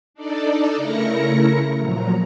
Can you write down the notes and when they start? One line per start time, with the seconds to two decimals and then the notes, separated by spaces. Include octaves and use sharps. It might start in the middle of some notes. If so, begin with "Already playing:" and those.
0.14 D4 D#4 A4 D5
0.77 C#3 A3 E4 A#4 A#6 C#7
1.77 A#2 F3 F#3 A#5